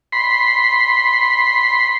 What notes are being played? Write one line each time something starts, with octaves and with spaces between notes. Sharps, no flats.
B5 C6